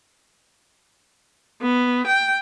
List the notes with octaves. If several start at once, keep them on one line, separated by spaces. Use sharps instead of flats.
B3
G5